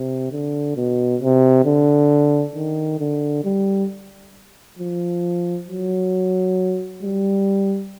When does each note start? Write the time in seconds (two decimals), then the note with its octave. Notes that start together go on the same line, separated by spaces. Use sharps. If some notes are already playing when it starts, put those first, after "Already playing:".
Already playing: C3
0.31 D3
0.76 B2
1.21 C3
1.65 D3
2.55 D#3
3.00 D3
3.44 G3
4.79 F3
5.68 F#3
7.02 G3